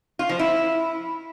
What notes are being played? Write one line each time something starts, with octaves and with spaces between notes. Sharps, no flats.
F4
F3
E4